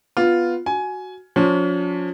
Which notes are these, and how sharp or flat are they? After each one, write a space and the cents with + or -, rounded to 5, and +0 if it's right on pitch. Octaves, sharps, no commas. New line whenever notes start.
B3 +0 F4 +0
F#4 +0 G#5 +15
F3 +40 C#4 +40